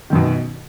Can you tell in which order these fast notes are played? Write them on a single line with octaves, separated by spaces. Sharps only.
D#3 F#2 B2